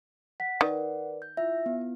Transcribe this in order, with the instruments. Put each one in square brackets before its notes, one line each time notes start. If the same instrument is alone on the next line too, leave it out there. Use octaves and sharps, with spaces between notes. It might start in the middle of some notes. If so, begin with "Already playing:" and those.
[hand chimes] F#5 [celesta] B6
[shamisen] D#3 [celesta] A#4 B4 D5
[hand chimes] G6
[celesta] E4 F4 [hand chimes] E5
[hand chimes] B3